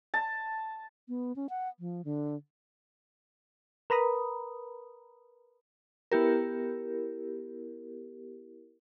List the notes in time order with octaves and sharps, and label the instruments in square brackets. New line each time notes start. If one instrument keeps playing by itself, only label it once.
[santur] A5
[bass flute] B3
C#4
F#5
F3
D3
[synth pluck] A#4 B4 A#5 B5 D#6
[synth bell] B3 E4 G4 A#4